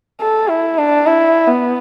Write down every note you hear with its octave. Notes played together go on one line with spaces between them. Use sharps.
A4
E4
D4
E4
B3